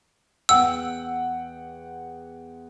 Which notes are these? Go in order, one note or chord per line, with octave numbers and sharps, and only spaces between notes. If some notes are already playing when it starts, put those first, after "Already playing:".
E2 F#5 G5 E6